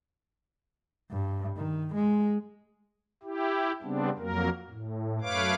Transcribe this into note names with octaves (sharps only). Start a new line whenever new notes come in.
G2
D#3
G#3
E4 G4
C#3 G3 B3 C4 D4
F2 F#3 A#3 A#4
A2
F#2 A3 B4 C#5 F5 D6